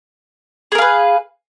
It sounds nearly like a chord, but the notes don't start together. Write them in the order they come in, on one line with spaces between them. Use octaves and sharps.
G#4 A#4 F5 B4